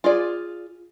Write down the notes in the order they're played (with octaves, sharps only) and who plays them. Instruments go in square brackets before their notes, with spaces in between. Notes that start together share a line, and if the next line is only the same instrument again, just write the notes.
[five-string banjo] F4 G#4 D5